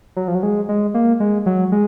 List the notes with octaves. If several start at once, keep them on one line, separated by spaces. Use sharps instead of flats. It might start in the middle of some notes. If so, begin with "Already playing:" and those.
F#3
F3
F#3
G#3
G#3
A#3
G#3
F#3
G#3